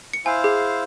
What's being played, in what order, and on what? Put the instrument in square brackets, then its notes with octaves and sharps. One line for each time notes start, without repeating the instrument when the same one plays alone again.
[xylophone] C#7
[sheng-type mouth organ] E4 C5 F5 [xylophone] G#5
[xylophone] G#4